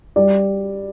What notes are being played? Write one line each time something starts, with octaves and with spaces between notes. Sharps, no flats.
G3 D5